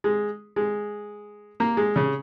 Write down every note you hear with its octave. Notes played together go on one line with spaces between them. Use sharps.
G#3
G#3
A#3
G#3
C#3